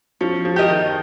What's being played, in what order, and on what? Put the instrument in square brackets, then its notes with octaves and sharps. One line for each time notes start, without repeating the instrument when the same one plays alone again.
[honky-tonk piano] F3 [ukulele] C#4
[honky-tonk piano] F3
[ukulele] G4 A#4 D#5
[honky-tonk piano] D#3